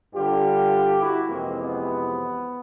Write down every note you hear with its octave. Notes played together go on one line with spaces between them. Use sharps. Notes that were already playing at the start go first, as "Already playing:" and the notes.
G2 D3 G3 F4 G4
E4 F#4
F2 C3 E3 G#3 A#3 C4
B3